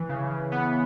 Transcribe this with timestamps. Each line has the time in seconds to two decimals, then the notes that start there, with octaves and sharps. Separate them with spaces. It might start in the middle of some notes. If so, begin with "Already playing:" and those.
Already playing: E3
0.09 C#3
0.31 C#3
0.52 B3